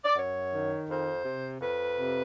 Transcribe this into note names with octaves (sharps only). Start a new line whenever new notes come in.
D5
F#2 C#5
D#3
F2 C5
C3
F2 B4
C3